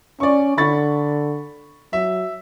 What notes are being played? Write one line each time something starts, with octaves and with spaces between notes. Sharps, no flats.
C#4 D5 C#6
D3 B5 C#6 A6
F#3 E5